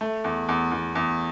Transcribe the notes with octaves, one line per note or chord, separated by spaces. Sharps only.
A3
E2
E2
E2
E2